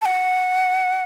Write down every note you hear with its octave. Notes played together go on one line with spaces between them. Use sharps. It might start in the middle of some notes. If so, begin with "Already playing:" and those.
A5
F#5